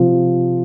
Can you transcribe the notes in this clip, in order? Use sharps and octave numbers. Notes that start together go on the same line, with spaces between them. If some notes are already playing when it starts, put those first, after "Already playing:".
Already playing: C3 F3